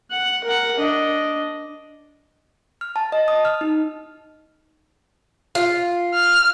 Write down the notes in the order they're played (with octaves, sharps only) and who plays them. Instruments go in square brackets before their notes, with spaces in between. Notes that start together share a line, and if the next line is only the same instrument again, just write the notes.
[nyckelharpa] F#5
A#4 F#5
D4 D#5
[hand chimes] F6
A5
D#5
D#6
F6
D#4
[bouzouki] F4
[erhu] F6